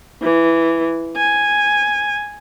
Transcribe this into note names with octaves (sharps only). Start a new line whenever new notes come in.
E3
G#5